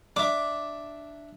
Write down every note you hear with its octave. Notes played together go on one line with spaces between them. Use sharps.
D4 E5 D6